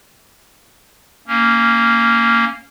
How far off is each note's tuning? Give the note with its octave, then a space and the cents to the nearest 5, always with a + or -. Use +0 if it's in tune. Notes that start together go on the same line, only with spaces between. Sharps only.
A#3 -10 C#4 +0